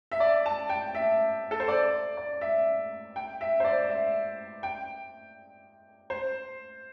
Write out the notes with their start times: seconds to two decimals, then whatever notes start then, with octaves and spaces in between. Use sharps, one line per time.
0.12 E5
0.20 D5
0.46 A5
0.69 G5
0.95 E5
1.51 A4
1.60 C5
1.68 D5
2.17 D5
2.41 E5
3.16 G5
3.41 E5
3.60 C5
3.64 D5
3.89 E5
4.63 G5
6.10 C5